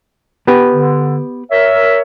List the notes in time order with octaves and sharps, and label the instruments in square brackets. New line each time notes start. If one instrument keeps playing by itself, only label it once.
[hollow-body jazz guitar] B3 G4 B4
[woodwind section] D3
A#4 C#5 E5